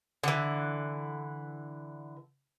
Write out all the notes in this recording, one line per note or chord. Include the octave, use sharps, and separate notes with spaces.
D3 E3